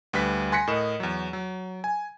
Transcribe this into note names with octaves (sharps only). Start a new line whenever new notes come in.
D2 G3 B4 B6
G#5 C6 F#6 A#6 B6 C#7
A2 A#4 D#5 E7
E2 F#3
F#3
G#5